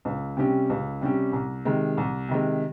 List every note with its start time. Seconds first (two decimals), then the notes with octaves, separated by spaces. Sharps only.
0.05 C#2
0.37 C3 G3 C#4 G4
0.70 C#2
1.01 C3 G3 C#4 G4
1.33 C2
1.65 C3 D#3 G#3
1.97 C2
2.29 C3 D#3 G#3